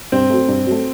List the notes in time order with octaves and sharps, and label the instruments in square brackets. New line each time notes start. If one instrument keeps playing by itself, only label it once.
[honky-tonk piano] G2 [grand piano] C4
[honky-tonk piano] F#3 A3
G2
F#3 A3